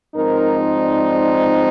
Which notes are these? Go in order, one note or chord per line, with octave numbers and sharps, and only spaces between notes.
G#2 F3 C4 D#4 A#4
D5